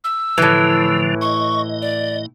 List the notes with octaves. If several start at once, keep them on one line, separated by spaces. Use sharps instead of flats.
E6
A2 D3 E3 F3
D#5 C#6
D5